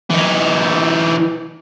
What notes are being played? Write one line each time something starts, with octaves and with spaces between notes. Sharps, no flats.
E3 D#4